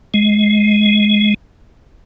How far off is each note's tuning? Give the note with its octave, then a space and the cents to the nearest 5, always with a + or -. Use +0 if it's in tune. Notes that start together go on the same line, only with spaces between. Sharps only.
G#3 +15